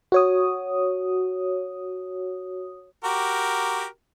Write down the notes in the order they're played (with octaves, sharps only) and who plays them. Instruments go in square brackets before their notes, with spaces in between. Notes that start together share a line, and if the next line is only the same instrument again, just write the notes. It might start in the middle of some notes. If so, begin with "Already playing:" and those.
[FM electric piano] F#4 C#5 D#6
[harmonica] F#4 G4 A#4